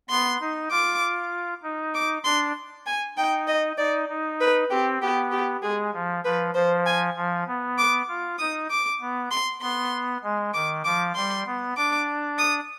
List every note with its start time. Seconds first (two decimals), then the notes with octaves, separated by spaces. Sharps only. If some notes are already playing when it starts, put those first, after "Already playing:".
0.10 B3 C6
0.41 D#4
0.71 F4 D6
1.63 D#4
1.95 D6
2.25 D4 C6
2.87 G#5
3.17 D#4 G5
3.48 D#5
3.78 D#4 D5
4.09 D#4
4.40 B4
4.70 C4 G4
5.01 B3 G4
5.31 G4
5.63 G#3 G#4
5.93 F3
6.24 F3 B4
6.54 F3 C5
6.86 G#5
7.16 F3
7.47 B3
7.78 D6
8.08 F4
8.39 D#4 D#6
8.70 D6
9.01 B3
9.31 C6
9.61 B3 C6
10.23 G#3
10.54 D#3 D6
10.85 F3 D6
11.15 G3 C6
11.46 B3
11.77 D4 D6
12.39 D#6